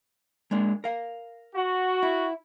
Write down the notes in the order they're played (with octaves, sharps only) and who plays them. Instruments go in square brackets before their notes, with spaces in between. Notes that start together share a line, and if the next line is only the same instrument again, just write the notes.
[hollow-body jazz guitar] G#3 A#3 D4
A#4 F5
[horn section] F#4
[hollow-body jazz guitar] E4